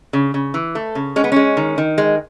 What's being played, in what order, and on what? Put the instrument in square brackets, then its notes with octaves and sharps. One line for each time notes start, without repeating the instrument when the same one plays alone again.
[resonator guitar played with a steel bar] C#3
C#3
E3
A3
C#3
G#3 C#4
B3
G#3 C#4
D#3
D#3
G#3